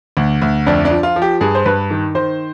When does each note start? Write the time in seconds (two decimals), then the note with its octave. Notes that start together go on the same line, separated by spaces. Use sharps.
0.17 D2
0.42 D2
0.67 F2 D4
0.85 D4
0.91 F3
1.03 F4
1.16 F3
1.22 G4
1.41 G2 G#4
1.55 C5
1.66 G2 B4
1.91 D#3
2.15 D#3 C5